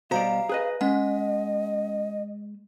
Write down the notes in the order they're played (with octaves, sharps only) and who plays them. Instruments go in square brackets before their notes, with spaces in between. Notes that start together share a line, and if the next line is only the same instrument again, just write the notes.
[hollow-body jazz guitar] B2 G3 D5 [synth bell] F#4 C5 A#5 [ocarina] F5
[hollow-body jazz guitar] G#4 B4 D#5
[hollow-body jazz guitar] G#3 [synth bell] C#4 F#5 [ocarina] D#5